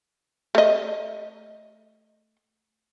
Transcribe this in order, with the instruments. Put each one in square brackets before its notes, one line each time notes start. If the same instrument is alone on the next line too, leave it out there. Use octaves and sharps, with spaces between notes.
[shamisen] A3 D#5